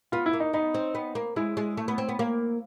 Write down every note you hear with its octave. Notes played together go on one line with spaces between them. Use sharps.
B3 F4
E4
A#3
D#4
B3 D#4
C4
B3
A#3
G#3 E4
G#3
A3
B3
C4
B3
A#3